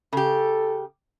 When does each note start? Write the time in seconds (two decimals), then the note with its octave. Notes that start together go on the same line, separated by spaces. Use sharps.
0.13 C#3 G4 A4